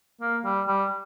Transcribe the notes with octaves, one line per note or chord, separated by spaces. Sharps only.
A#3
G3
G3